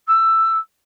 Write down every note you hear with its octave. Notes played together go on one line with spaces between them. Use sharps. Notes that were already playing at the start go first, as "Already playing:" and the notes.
E6